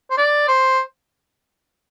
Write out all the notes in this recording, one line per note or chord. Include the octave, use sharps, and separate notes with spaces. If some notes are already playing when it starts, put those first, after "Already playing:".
C5
D5
C5